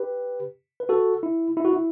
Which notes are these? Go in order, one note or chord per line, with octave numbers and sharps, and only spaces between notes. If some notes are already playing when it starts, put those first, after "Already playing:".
Already playing: G4 B4
B4
F#4 A4
E4
E4
F#4
E4